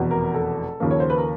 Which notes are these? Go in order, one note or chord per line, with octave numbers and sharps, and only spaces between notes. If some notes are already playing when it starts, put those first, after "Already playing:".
Already playing: F1 E2 B2
A#4
A4
D#2 C#3 F3 A#3
C#5
C5
B4
A#4